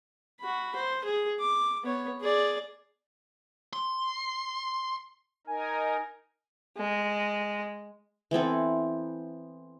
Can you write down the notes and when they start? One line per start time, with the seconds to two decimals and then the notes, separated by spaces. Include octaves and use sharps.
0.41 F#4 B5
0.76 C5
1.05 G#4
1.40 D6
1.84 B3 C#5
2.21 G#4 D5
3.73 C6
5.47 D#4 A#4 G#5
6.77 G#3
8.31 E3 B3 C4 A4